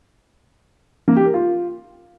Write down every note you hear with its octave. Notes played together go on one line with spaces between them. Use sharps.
A#3
G4
A#4
F4